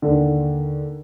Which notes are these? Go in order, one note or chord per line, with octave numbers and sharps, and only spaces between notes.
D#2 D3